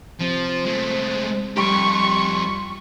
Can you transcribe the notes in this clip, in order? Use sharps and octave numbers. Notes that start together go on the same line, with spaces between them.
C3 F3 C5
G#3 A3
F2 G3 G4 C6 C#6 D7